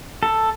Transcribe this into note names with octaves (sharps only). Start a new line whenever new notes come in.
A4